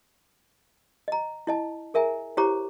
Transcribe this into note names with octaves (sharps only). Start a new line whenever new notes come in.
D#5 A#5
E4 D#5 A5
G#4 A#4 E5 G#5 A#5
E4 G4 C5 C#5 A#5 D6